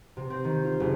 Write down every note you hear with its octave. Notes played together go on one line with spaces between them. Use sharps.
C3
C4
D#3
F4
F#1